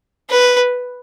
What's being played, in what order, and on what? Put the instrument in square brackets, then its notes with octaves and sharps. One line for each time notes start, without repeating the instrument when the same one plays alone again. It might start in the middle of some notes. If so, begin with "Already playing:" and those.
[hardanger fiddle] B4